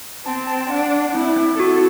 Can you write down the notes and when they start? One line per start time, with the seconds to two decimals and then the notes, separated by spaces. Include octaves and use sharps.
0.25 C4 A5
0.47 A5
0.70 D4 F#5
0.92 F#5
1.14 C4 E4
1.37 C4
1.59 F#4 A4